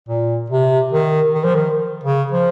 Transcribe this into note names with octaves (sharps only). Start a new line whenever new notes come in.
A#2
C3
D#3
D#3
F3
D#3
C#3
F3